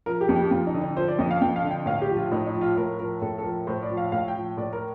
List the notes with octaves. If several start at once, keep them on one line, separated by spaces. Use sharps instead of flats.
F3 A#4
G4
F2
G4
F2 F4
D#4
D3
D#4
F3 C5
D5
F2 D#5
F5
F2 G5
F5
D3
G5
A2 F5
G4
F3
F4
A2 D#4
D#4
F3
F4
A2 A#4
F3 A#4
A2 A4
A4
F3 A#4
A2 C5
D5
F3
F5
A2 F5
G5
F3
A2 D5
A#4